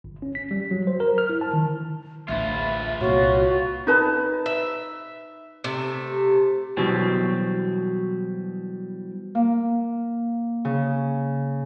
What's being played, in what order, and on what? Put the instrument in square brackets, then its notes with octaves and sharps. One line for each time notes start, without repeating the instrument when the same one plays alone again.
[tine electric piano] G1
C#4
B6
G3
F#3
C5
A#4
F6
E4
A5
D#3
[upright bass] A1 D2 [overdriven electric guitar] F4 B4 [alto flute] E5
[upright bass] C2 A#2 [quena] F#4 [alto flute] C#5
[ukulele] D#4 B4 A5
[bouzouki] E5
C3 A3
[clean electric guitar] B2 E3 F#3 G3 C4
[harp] A#3
C#3